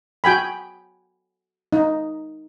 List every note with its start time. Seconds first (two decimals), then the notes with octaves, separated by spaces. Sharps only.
0.24 F#4 G5 G#5 B5
1.73 D#4